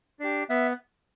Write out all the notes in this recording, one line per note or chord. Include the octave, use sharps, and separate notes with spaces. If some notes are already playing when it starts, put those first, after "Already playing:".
D4 G4
B3 E5